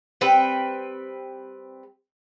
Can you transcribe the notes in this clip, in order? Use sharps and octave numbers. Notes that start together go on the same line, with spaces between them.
G3 C4 B4 G5